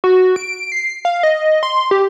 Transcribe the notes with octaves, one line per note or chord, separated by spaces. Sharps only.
F#4
D7
C7
F5
D#5
C6
G4